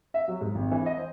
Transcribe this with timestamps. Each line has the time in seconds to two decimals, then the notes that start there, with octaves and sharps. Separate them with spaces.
0.14 E5
0.28 F#3
0.41 G#2
0.55 G#1
0.71 E3
0.86 D#5
0.98 C5